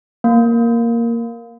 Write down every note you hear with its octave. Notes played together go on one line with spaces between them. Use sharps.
A#3